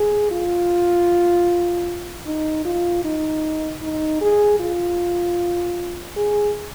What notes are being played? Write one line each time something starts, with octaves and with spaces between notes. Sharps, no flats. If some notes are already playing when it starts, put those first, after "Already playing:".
Already playing: G#4
F4
D#4
F4
D#4
D#4
G#4
F4
G#4